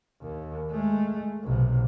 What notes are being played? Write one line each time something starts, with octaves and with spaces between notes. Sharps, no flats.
D#2
G#3 A3
B1 C3